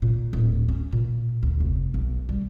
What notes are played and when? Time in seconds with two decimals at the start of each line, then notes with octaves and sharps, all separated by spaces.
0.02 A#2
0.33 D1
0.69 C#4
0.93 A#2
1.43 D2
1.60 F1
1.94 B1
2.29 G3